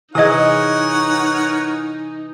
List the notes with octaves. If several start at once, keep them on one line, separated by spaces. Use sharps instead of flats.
C3 E3 D#4 G#4 A#4 C#5 D#5 F#5